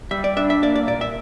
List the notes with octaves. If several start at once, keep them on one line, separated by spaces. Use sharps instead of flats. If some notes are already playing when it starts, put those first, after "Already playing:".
G3 E5
D5
D4 E5
E5
A#3 D5
D5
A#2 D5
E5